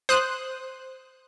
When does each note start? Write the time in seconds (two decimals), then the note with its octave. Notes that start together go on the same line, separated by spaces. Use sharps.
0.09 C5 D#6 F#6